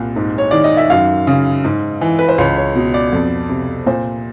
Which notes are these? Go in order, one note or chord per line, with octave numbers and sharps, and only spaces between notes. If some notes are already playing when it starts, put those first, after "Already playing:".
Already playing: C2 A#2
G#2
C#5
D#3 D5
D#5
E5
F#2 F5
C#3
G#2
E3
B4
C5
C#2 C#5
C#5
B2
D5
F2
C3
A#2 C5